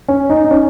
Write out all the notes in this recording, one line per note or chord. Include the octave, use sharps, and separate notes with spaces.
C#4
D#4
D#4
C#4